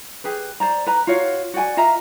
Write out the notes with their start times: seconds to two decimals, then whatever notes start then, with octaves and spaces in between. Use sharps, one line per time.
0.24 G4 G#4 B4
0.60 C5 D5 A#5
0.87 B4 A#5
1.07 F4 F#4 C#5 F5
1.54 F#4 D5 G5 G#5
1.77 F4 D#5 E5 A#5